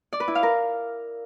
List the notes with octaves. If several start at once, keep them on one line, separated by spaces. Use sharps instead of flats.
D5
B4
E4
F5
A#4